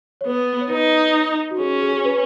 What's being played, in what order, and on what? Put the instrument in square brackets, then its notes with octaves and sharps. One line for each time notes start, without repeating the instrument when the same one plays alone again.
[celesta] C#5
[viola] B3 [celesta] B4
[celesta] C#5
[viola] D#4 [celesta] B4
[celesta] F#4
[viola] C#4 [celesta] G#4
[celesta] G#4
G#4
G#4
B4